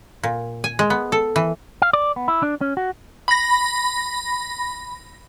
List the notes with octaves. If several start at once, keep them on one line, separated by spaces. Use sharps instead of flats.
A#2
G#5
G#3
B3
A4
E3
F5
D5
B3
E4
D4
C#4
F#4
B5 A#6